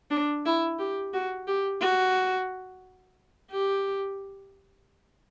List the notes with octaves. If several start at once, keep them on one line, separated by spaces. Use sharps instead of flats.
D4
E4
G4
F#4
G4
F#4
G4